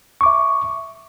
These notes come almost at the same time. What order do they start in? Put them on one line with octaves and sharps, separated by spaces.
C#6 D6 E5